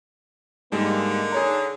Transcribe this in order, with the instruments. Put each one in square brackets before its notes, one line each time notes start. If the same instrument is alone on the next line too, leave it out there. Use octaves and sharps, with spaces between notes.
[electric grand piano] G#2 G3 G#3 [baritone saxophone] D3 [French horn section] A#3 D#4
[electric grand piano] G#4 C#5 A#5